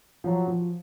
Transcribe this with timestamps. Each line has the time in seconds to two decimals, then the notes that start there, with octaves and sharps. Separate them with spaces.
0.24 F3 F#3
0.48 F3